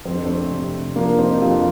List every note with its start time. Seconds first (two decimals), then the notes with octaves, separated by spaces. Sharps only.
0.05 F2 C4
0.15 D4
0.26 A3 C4
0.51 C3
0.96 F3 A#3 D4
1.18 C4 D#4
1.31 G4
1.41 F2 D4 F4